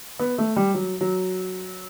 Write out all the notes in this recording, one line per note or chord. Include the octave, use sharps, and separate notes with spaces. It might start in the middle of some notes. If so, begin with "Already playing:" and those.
B3
A3
G3
F#3
F#3